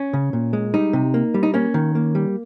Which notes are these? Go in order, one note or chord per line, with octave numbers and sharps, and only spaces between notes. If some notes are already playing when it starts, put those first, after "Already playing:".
Already playing: C#4
C#3
A#2
G#3
G3 D#4
C3
A#3
G3
D#4
A#3 C#4
D#3
A#3
G3